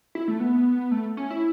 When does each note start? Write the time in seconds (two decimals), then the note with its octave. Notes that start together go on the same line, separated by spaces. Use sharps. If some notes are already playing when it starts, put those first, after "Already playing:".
0.15 E4
0.28 A3
0.40 B3
0.91 A3
1.17 C#4
1.30 E4